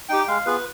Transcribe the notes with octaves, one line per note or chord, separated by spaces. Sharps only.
D#4 G4 G5
G#3 F5
B3 F4 G#4 B4